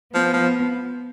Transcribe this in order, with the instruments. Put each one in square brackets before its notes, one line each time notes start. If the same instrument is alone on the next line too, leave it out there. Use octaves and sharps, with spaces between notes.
[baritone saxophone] F3 [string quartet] B3
[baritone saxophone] F3